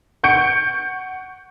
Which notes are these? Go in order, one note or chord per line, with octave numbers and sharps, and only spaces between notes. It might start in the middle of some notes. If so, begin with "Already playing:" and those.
F#5 C#6 G6 C#7 D7